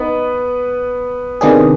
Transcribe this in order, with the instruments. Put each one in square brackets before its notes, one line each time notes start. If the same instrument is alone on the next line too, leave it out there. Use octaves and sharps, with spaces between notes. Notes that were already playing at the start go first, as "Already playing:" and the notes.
Already playing: [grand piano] B3 B4 [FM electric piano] D#4
[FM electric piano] C3 D#3 B3 D4 G#4